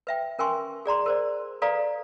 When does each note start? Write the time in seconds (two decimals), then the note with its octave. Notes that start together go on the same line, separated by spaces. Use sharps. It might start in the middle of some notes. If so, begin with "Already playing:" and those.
0.07 B4 E5 G5
0.39 C#4 A#4 G5 G#5 C6 C#6
0.86 G#4 D5 A#5 C6
1.06 A#4 C5 D5
1.62 A4 B4 D5 F5 A#5